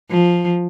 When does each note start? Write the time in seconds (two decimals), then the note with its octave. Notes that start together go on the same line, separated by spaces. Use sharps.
0.10 F3